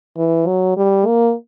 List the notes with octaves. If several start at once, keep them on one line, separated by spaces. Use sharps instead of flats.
E3
F#3
G3
A#3